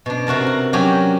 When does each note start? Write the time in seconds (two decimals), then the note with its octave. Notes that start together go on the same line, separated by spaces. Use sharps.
0.06 B2 D4
0.27 C3 F#4 A#4 A5
0.47 A#4
0.73 F#3 C#4 D4 F#4 G4